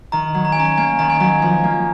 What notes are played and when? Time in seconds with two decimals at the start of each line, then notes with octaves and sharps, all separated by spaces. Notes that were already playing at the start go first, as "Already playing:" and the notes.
0.12 D#3 A#5
0.34 F#3
0.45 A#5
0.52 G#5
0.56 C#4 A#5
0.77 A#3 G#5
0.99 D#3 A#5
1.10 G#5
1.20 F#3 A#5
1.42 F3
1.64 A#3